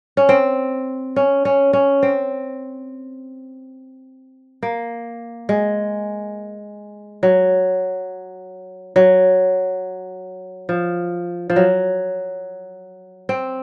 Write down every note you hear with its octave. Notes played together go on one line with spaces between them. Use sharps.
C#4
C4
C#4
C#4
C#4
C4
A#3
G#3
F#3
F#3
F3
F3
F#3
C4